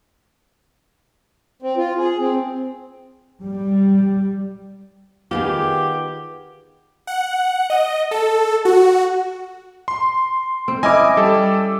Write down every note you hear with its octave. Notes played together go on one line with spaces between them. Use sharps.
C4
F4
G#4
C4
G3
D#3 B3 F4 G4 G#4
F#5
D#5
A4
F#4
C6
C4
C#4 E4 D#5 G#5 D6
G3 A4